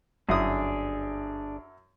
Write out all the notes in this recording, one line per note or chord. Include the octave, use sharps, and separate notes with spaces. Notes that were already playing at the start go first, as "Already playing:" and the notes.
G1 F#2 D4 E4 G#4 D#6